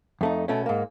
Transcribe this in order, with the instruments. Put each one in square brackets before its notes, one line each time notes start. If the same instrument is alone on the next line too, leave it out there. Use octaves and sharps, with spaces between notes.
[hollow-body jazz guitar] F2 A3 D#4
B2 A3 C#4
G#2 A#3